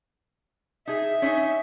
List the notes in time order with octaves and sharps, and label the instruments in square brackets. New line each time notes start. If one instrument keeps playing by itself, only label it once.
[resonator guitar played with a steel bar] D#4 G#4 [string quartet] E5
[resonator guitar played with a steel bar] C#4 D#4